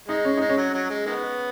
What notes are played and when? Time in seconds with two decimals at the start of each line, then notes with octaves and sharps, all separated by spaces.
0.08 G#3 D#4
0.25 C#4
0.37 G#3 D#4
0.49 C#4
0.57 F#3
0.74 F#3
0.90 G#3
1.06 D#3 G#3 B3